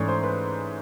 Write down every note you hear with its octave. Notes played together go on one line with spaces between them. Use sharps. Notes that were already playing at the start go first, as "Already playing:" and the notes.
Already playing: G#2 E3 A3 C#4 C#5 D5
C5
B4